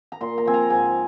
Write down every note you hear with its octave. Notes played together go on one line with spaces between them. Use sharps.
A#5
A#2 C6
A#5
F3 C4 G#5
A#5
G#2 G#5